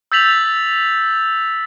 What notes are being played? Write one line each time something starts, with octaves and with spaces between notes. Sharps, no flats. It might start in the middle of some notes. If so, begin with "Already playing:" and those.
E6 G6 A6 B6 F7 F#7